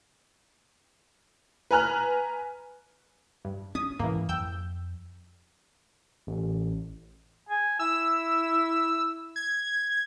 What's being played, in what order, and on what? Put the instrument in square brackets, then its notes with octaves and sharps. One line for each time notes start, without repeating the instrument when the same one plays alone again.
[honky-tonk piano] B4 G#5 A#5 F6 F#6
[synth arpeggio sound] G2
[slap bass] C#4 [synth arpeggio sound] D#6
[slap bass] G#2 [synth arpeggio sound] E3 A#3
[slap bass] F2 [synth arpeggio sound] G5 E6 G6
[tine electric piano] A1
[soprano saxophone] G#5
[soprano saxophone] E4 [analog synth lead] E6
[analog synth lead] G#6